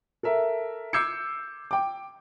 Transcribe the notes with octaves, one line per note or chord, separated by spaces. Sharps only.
A4 A#4 E5
D6 E6 G6 G#6 C7 C#7
G5 D6